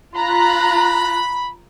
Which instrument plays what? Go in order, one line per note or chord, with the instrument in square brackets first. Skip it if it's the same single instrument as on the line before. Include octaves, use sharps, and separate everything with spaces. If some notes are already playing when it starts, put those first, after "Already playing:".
[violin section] F4 A#5 F#6 [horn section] B5